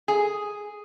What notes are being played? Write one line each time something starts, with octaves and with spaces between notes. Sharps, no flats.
G#4